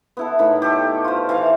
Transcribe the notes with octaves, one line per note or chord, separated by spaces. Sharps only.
B3 E4 A4
A2 D#3 B5
G4 A4 C#5
F4 C5
E3 F5 A5